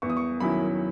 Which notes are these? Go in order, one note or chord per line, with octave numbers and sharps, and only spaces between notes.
E2 C#6
D#6
C#6
D#3 F#3 C#4 E4 B5